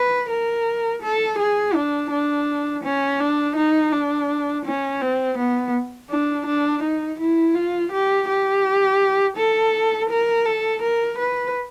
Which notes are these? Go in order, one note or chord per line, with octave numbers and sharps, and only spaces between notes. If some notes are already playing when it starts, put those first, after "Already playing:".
Already playing: B4
A#4
A4
G#4
D4
D4
C#4
D4
D#4
D4
C#4
C4
B3
D4
D4
D#4
E4
F4
G4
G4
A4
A#4
A4
A#4
B4